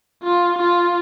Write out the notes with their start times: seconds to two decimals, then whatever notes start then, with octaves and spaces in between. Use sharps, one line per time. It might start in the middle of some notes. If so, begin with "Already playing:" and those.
0.23 F4
0.59 F4